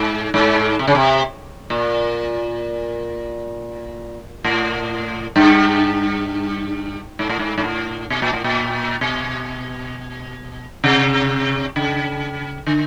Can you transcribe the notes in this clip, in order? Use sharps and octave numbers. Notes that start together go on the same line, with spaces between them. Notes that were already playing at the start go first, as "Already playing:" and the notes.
Already playing: G#2
G#2
C3
C#3
C3
A#2
A2
G2
G#2
A2
G#2
G#2
A2
B2
A#2
A2
A#2
B2
C3
C#3
D3